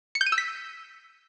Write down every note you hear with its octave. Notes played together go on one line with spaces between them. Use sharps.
C#7
G6
D#7
E6
B6